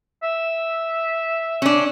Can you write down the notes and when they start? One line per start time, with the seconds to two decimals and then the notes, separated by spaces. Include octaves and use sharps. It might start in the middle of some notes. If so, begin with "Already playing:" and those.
0.23 E5
1.62 C#4 D4